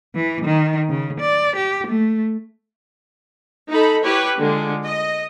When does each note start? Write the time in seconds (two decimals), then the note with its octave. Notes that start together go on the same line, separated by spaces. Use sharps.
0.15 E3
0.44 D#3
0.89 C#3
1.20 D5
1.56 G4
1.87 A3
3.70 D#4 A4 B5
4.02 E4 G4 B4 C#5
4.39 D3 G#3 F4
4.85 D#5